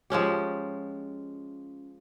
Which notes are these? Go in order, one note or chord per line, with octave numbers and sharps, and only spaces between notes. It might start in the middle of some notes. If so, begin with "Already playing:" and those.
F3 G#3 C#4 G4